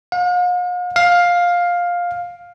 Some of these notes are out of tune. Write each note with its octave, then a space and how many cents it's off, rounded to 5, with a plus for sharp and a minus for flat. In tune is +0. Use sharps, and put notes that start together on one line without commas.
F5 +45
F5 +10